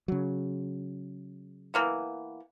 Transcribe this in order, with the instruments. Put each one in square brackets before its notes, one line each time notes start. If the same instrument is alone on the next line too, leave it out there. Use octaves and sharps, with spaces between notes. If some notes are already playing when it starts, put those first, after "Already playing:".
[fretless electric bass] C#3 F#3
[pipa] E3 A#3 B3